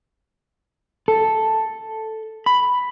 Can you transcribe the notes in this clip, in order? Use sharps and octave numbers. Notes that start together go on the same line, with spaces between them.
A4
B5